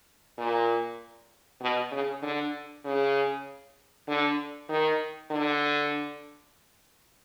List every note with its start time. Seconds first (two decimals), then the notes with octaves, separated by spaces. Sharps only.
0.38 A#2
1.61 B2
1.92 C#3
2.22 D3
2.85 C#3
4.08 D3
4.69 D#3
5.31 D3